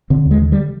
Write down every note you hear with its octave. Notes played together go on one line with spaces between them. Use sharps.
D3 C4
D#2
G#3
D3
G3